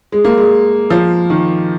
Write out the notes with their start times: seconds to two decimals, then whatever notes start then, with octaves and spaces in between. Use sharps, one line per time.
0.12 G#3
0.24 A#3
0.38 G#3
0.90 F3
1.30 D#3